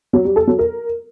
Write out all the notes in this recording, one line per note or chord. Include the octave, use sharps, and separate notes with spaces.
F#3
G3
A4
F#3
A#4